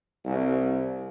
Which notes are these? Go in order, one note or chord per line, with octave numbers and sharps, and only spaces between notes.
C2